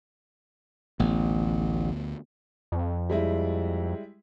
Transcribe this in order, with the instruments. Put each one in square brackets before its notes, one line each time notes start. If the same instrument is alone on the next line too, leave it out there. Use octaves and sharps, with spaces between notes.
[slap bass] A1 [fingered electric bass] D2 B3
[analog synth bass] F2
[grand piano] G3 G#3 E4